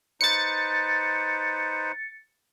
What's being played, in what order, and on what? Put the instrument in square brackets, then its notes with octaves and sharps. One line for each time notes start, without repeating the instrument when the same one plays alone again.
[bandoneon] D#4 B4 C5 [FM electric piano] A6 C#7